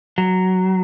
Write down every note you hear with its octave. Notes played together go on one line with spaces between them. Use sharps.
F#3